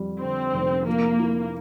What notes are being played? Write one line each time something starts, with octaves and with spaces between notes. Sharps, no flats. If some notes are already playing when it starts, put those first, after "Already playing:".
Already playing: F2 G3
D3 C4
F1
F3 A#3
E4